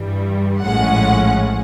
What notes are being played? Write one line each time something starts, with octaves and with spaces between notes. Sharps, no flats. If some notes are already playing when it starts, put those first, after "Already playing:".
Already playing: G2 E3 G3
A#1 A2 F3 G#3 C#4 F#5